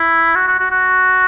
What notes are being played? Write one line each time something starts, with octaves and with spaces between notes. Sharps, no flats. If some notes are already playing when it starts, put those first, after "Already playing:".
Already playing: E4
F#4
F#4
F#4
F#4